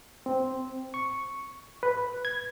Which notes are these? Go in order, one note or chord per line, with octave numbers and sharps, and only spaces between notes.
C4
C#6
B4
G#6